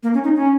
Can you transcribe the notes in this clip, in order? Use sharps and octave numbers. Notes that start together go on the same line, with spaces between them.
A#3
C#4
D#4
C#4